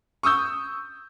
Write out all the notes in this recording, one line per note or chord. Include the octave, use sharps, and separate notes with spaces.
C#6 D#6 E6 G6